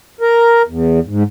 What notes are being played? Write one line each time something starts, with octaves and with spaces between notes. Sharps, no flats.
A#4
E2
G#2